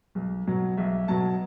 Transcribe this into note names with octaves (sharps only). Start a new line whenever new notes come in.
B1
B2 F#3
B1 E5
B2 F#3 A5